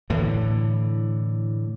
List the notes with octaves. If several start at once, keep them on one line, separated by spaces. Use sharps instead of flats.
A2 D3 E3